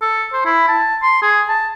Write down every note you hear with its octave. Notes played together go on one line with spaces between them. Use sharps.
A4
C5
E4
A5
C6
G#4
A5